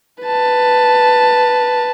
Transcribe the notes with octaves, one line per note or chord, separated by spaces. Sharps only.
B4 A5